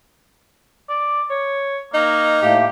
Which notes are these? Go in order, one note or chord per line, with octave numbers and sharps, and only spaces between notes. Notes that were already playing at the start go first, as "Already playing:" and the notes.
D5
C#5
A#3 D#4
A2 A3 A#3 G4